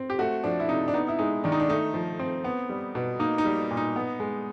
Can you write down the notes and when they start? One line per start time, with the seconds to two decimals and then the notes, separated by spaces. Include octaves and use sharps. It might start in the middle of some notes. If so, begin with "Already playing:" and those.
Already playing: C4
0.10 G4
0.19 A3 F#4
0.44 F3 D4
0.60 E4
0.69 C3 D#4
0.88 D4
0.94 B3 D#4
1.08 E4
1.19 G#3 D#4
1.44 D#3 D4
1.52 D#4
1.60 D4
1.69 A3 D#4
1.94 F3
2.20 C4
2.44 B3
2.69 G3
2.95 B2
3.19 A#3 D#4
3.38 D#4
3.45 G3
3.71 A#2
3.77 D#4
3.96 B3
4.20 G#3